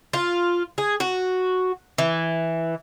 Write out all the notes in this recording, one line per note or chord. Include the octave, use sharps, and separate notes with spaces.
F4
G#4
F#4
E3